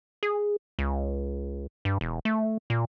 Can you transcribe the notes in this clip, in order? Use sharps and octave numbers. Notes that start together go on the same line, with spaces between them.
G#4
C#2
G2
E1
A3
A#2